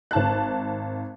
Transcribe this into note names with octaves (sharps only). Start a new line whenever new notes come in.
G#1 A5 F#6